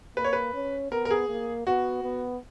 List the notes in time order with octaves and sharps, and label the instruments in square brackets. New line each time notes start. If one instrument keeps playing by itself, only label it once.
[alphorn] A#3 [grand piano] B4
[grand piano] C#5
B4
[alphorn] C#4
[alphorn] B3 [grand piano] A#4
[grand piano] A#4
G#4
[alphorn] A#3
[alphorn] B3 [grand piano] F#4
[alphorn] B3